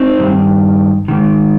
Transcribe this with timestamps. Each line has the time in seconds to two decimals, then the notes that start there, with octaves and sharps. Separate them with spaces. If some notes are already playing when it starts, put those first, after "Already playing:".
Already playing: C4 D#4
0.19 G2 D#3
1.08 G#2 D#3